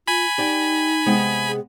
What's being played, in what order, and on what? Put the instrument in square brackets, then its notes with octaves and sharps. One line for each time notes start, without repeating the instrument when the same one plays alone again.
[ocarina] F4 [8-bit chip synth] G#5 B5
[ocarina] D#4 [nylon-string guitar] G4 D5 G5
[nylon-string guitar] C3 G#3 B3
[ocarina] G#4